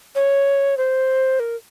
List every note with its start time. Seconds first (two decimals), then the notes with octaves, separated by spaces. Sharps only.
0.15 C#5
0.77 C5
1.40 A#4